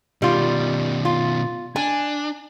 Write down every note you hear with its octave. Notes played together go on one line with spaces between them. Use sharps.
B2 D#3 G3 F4
F4
D4 G#5